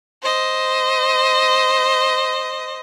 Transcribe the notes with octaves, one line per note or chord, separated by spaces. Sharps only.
C5 D#5